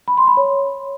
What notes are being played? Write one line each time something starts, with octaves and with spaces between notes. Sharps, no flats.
B5
C6
B5
C#5